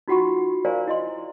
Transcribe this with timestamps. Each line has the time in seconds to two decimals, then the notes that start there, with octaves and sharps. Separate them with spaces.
0.08 D#4 F4 F#4 F#5 B5 C#6
0.65 A#4 C5 D5 F5 G#5 A#5
0.88 E4 D#5 C6